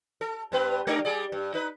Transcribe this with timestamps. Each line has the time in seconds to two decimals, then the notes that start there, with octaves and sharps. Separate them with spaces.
0.21 A4
0.52 G2 B3 B4
0.87 G#3 D4 A#4
1.05 G3 G#4 D5
1.32 G2
1.54 D#4 B4